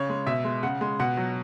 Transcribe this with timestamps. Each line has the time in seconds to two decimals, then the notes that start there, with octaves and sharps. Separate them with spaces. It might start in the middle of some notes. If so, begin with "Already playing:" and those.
Already playing: C#3 C#5
0.09 G#3
0.26 B2 E5
0.44 G#3
0.63 C#3 F#5
0.81 G#3
1.00 B2 F#5
1.17 F#3